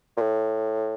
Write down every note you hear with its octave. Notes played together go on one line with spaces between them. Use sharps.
A#2
A2